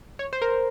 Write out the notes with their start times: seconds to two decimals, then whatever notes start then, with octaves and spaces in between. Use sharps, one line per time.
0.19 C#5
0.33 C5
0.42 A#4